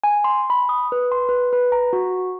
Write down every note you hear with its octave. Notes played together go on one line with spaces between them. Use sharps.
G#5
C6
B5
D#6
B4
C6
B4
B4
A#5
F#4